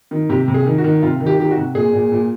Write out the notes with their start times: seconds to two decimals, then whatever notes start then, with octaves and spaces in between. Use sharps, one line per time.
0.11 D#3
0.29 C3 G4
0.48 C3
0.54 G#4
0.66 D#3
0.78 F#4
0.84 D#3
1.02 C3 F4
1.20 D#3
1.26 G4
1.39 D#3 G4
1.51 F#4
1.57 C3
1.75 A#2 G#4
1.93 A#2
2.12 A#2